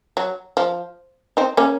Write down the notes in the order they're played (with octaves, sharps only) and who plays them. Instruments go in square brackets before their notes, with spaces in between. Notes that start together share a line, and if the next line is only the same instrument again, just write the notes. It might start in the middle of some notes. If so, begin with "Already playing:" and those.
[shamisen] F#3
F3
C4 D#4
A#3 C#4